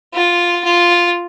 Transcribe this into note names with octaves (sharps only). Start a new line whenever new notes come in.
F4
F4